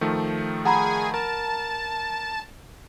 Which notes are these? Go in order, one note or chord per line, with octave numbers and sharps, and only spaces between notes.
D#3 F3 A3
G#4 F#5 G#5 A#5 B5
A#4 A5